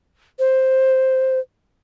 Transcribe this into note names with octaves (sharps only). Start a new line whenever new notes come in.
C5